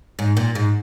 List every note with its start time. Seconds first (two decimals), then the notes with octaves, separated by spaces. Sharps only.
0.19 G#2
0.37 A#2
0.55 G#2